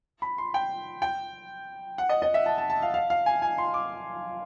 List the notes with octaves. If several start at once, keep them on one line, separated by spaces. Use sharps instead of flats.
B5
C6
G5
G5
F#5
D#5
D#5
E5
A5
A5
A5
F5
F5
F5
G#5
G#5
C6
D6